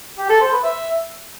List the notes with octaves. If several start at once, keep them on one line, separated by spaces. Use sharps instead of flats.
G4
A4
C5
B4
E5